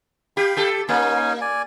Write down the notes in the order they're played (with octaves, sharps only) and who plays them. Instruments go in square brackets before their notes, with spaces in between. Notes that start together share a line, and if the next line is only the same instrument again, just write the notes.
[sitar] G4 [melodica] F5 G5 B5
[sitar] G4 A4
[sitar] A#3 [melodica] C#4 D#4 G#5
[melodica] D5 G#5